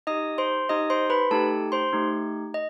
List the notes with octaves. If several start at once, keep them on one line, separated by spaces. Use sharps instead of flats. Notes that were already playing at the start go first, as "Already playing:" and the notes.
D#4 G4 D#5 D#6
C5 C6
D#4 G4 D#5 D#6
C5 C6
B4 B5
A3 D#4 G4 A4 A5
C5 C6
A3 D#4 G4
D#5